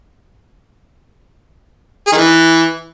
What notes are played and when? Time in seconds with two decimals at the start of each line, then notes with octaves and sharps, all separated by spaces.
2.07 G#4
2.12 D#3
2.17 E3